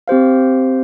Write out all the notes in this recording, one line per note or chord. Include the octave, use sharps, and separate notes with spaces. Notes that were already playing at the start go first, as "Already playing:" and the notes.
C4 G4 C5 F5